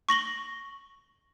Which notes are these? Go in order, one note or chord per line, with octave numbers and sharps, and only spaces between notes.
C#6 A#6 F#7 G7